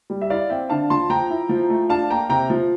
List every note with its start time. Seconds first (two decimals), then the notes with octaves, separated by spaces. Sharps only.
0.10 G3
0.21 E5
0.30 E4 D5 F5
0.50 C4 E5 G5
0.70 D3 F5 A5
0.90 F3 A5 C6
1.10 F3 G5 A#5
1.30 E4
1.49 F3
1.70 A3
1.90 D4 F5 A5
2.10 A#3 G5 A#5
2.29 C3 G5 A#5
2.50 F3